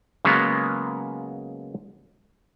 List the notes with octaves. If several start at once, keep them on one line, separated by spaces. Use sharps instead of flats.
C#3 F#3 G#3 A#3 B3